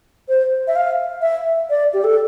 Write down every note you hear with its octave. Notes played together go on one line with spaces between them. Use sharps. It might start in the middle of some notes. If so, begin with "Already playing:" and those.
C5
E5
F5
E5
D5
G4
A4